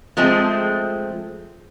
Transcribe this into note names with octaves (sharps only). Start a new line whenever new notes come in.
F3 G#3 A3 C4 G#4